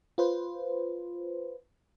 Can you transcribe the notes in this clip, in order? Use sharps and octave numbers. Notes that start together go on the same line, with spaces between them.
F4 B4 C5